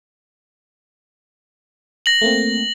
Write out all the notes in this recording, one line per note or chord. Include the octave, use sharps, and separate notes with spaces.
A#6 F#7
A3 A#3 C4